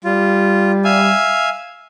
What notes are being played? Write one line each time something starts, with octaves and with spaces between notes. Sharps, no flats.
G3 F4
E5 F5 G#5